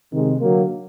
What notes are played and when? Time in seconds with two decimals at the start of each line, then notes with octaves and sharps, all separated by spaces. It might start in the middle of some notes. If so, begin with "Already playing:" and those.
0.11 C3 D#3 G#3
0.40 D3 F#3 A#3